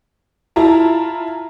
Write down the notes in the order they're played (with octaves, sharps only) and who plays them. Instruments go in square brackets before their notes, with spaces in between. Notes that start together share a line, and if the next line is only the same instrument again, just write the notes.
[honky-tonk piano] E4 F4 A5 A#5